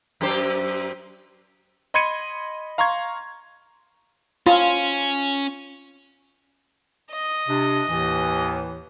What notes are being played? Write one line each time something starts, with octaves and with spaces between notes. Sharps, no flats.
F#2 G4 C5
D#5 B5 C6 G#6 C#7 D#7
F5 A#5 C6 C#6 G#6
C#4 F4
D#5
C3 D4
D#2 A2 E3